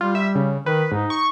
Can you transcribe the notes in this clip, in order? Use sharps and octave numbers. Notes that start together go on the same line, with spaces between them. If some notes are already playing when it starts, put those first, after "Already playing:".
G3 F4
E5
C#3
D#3 B4
G#2 D#4
C#6